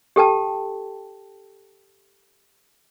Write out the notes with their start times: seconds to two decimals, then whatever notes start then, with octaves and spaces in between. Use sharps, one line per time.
0.16 G4 A4 G5 A5